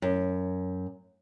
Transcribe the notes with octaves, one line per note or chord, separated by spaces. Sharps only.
F#2